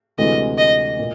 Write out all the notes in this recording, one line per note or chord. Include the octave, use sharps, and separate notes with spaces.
D2 C3 E3 G#3 D#5
D#5
A#2